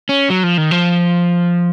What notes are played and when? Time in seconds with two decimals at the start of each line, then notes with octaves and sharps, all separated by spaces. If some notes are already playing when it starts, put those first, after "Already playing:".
0.09 C#4
0.30 F#3
0.43 F3
0.58 D#3
0.71 F3